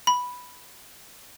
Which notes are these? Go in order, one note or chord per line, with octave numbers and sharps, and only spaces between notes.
B5